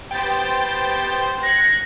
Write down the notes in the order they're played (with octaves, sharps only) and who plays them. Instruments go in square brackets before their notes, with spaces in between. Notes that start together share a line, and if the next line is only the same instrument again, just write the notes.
[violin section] B3 G4 C5 [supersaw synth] G5 A6
[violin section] F#6 G#6 C#7 [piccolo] A#6